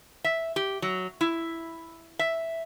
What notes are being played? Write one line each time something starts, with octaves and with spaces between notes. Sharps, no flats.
E5
G4
F#3
E4
E5